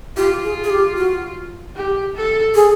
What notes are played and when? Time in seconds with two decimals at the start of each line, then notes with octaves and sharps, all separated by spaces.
0.17 F4 G4
0.44 G#4
0.64 G#4
0.70 G4
0.97 F#4
1.76 G4
2.15 A4
2.55 G#4